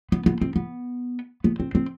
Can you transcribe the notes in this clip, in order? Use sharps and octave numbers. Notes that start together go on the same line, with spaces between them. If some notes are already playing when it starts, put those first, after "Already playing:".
B3
B3
C4
B3
B3
C4
C4